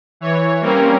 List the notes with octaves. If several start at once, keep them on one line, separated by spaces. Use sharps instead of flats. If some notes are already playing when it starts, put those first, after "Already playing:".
E3 C#5
G3 A#3 C4 C#4 A#4